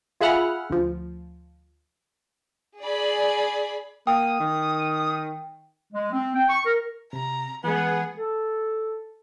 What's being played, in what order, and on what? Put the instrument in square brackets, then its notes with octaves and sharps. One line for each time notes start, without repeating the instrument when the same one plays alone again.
[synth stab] F4 G#4 E5 F#5 B5 F6
D2 F3
[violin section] G#4 D5 B5
[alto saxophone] A#3 [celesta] G5 [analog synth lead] D#6
[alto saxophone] D#3
[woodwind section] G#3
C4
G5
C#6
A#4
[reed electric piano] C3 [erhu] A#5
[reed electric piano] E3 G#3 [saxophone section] B3 [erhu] G#4
[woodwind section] A4